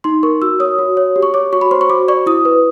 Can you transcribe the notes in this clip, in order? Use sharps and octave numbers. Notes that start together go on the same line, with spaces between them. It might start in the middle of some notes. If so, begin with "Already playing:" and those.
D#4 C6
A#4 C#6
F#4 E6
C#5 D#6
F#4
C#5
G4
C#6
C#5 D6
F#4 C#6
B5
C5 C6
C#6
F#4 D6
D5 C#6
E4 D#6
B4